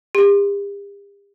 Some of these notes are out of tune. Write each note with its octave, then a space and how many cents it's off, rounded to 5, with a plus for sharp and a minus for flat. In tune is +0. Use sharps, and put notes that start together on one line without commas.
G4 +45